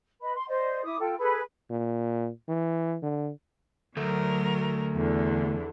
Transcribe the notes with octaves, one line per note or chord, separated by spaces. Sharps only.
B4 D#5 B5
C6
C5 D5 D#5
E4 D6 D#6
F4 A4 G5
G#4 A4 B4 B5
A#2
E3
D3
D2 F#3 A3 A#4
E2 D3